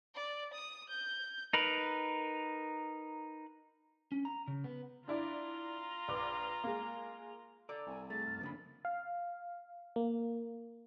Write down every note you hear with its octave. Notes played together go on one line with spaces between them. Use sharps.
D5
D#6
G6
D#4 A#4 B4
C#4
A#5
C#3
B3
D4 E4 F4 D5 A#5
A#1 B4 D6
G#3 A#3
A4 D5 A#5 D6 E6
C2 G#5
A3 G#4 A6
F#2 F6
F2 C#3 A#3 C4 D4 B5
F5
A#3